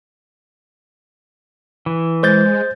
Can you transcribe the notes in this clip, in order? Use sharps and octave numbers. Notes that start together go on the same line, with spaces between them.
E3
G#3 C5 G6 A6